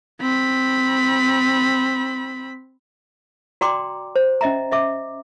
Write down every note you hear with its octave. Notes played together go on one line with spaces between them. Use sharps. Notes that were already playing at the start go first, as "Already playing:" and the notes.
C4 B5
F#4 D5 G5 A#5 C6 D6
C5
C#4 D#5 E5 A#5
D#5 E5 D6